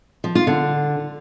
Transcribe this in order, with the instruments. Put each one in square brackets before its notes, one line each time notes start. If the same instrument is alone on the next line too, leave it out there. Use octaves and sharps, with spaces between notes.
[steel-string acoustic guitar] F3
F4
D3